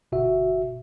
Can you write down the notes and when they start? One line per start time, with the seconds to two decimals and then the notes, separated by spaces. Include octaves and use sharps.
0.12 G1 B2 F#4 E5